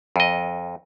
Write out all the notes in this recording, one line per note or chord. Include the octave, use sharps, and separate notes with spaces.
F2 D#5